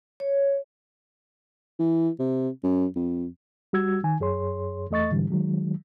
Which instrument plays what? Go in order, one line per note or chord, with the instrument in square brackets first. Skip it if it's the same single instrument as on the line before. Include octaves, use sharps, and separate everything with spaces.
[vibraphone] C#5
[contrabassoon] E3
C3
F#2
F2
[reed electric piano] G3 F#4 E6 G#6
D#3 G#5
F#2 G#4 C#5 C6
E2 A3 D#5 C#6 A6
G#2 D3 E3 G3
D#3 F#3 G#3